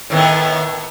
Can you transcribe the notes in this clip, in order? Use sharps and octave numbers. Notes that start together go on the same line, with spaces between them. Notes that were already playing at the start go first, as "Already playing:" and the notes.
A2 D#3 B3